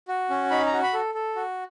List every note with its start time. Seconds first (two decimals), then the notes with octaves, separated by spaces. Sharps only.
0.08 F#4
0.30 C#4
0.51 D#4 B5
0.67 A#5
0.72 F#4
0.83 B5
0.93 A4
1.15 A4
1.36 F#4